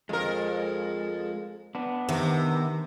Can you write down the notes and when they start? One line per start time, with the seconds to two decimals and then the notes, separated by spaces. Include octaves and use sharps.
0.09 F2 G#3 A#4
1.75 B3 D4
2.09 C3 D#3